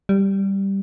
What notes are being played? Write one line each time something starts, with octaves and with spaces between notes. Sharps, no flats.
G3